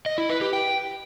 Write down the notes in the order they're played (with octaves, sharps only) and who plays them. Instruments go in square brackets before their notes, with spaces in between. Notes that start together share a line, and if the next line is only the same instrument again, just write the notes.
[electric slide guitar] D#5
E4
B4
G4
G5